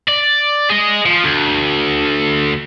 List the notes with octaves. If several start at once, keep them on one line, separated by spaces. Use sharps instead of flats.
D5
G#4 D#5
F3
D2